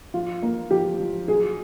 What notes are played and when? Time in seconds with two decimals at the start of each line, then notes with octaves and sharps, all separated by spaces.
0.14 F3 F4
0.43 A#3
0.71 F3 G4
0.99 F3
1.28 F#3 G#4